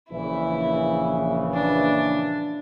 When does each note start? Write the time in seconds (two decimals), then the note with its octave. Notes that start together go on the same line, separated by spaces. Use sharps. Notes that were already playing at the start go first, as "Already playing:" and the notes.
0.10 A#1 C#3 E3 E4
1.54 D4